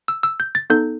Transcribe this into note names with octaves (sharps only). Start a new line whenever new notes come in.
E6
E6
G6
A6
B3 D#4 A4 G6